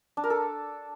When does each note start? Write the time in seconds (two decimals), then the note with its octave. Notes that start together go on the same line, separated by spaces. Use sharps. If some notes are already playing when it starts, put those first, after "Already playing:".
0.17 D4
0.24 A#4
0.30 A4